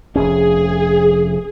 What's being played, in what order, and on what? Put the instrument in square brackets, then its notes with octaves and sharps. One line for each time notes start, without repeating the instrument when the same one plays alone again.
[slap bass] F1 F2 C#4 [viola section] G#4